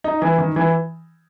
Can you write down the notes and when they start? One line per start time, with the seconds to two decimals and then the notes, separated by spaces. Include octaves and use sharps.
0.04 D#4
0.22 E3
0.38 D#3
0.56 E3